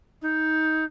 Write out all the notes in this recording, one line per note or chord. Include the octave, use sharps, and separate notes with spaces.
D#4